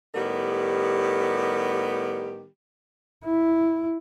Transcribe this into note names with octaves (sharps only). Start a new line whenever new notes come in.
A2 D#3 G3 B3 G4
E4